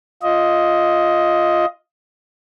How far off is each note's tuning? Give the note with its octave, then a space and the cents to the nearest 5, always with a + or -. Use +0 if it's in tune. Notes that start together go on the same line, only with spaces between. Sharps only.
F4 +0 D#5 +10